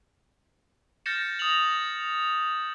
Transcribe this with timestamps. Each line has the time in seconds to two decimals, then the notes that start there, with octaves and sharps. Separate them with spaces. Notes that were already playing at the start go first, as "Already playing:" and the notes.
1.06 F6 G6 A6 A#6 C#7 E7
1.39 D#6 A6 A#6 F7 F#7